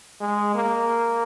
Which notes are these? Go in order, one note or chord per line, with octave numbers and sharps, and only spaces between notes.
G#3
A#3